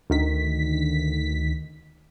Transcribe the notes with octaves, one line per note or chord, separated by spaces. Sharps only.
D2 D#3 B6